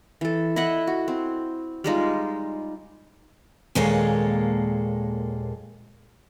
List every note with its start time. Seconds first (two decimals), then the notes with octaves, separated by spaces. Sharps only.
0.21 E3 A4
0.56 E4 D#5 E5 F#5
0.87 F#4
1.08 C4
1.84 G3 G#3 D#4 F4
3.75 D#2 A#2 G#3 A#3 A4 C#5